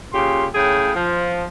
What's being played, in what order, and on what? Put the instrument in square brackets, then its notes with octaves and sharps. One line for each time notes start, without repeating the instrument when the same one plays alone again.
[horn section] A#2 C#3 G4 C6
A2 C#3 G#4 G5
F3